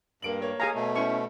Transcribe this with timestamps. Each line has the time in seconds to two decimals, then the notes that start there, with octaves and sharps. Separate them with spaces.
0.22 G2 A#3 D7 F#7
0.42 A#3 C#5
0.60 G#4 F5 G#5 A#5
0.75 B2 A3
0.96 C#4 E4 C5 C#6